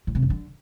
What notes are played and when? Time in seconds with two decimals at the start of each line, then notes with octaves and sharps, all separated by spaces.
0.07 A2
0.15 C3
0.22 F#2
0.30 D3